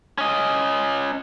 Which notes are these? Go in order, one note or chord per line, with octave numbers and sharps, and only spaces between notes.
C#4 D#5